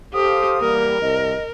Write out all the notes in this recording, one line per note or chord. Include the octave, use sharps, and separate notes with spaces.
G4 A4 C5 F5 D#6
E2 G3 A#3 A#4
C2 D#5